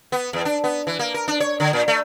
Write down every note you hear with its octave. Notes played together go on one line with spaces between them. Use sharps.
B3
E2
D4
B3
E3
A#3
A#4
D4
C#5
D3
A#2
A3